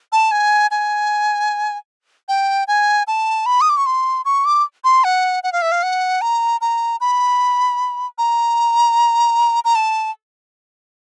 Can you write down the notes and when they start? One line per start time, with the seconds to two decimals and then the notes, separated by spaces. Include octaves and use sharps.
0.12 A5
0.32 G#5
0.71 G#5
2.29 G5
2.68 G#5
3.07 A5
3.46 B5
3.61 D#6
3.70 D6
3.77 C#6
3.86 C6
4.25 C#6
4.45 D6
4.84 C6
5.04 F#5
5.44 F#5
5.53 F5
5.62 E5
5.72 F5
5.83 F#5
6.21 A#5
6.61 A#5
7.01 B5
8.18 A#5
9.65 A#5
9.75 A5